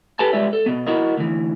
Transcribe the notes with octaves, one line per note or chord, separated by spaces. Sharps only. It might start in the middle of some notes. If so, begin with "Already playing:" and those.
G4 A4 B4 G#5 A5
G3 G#3 F4 D5 E5
A4
B2 B3
E4 F#4 A#4 D#5
D2 E3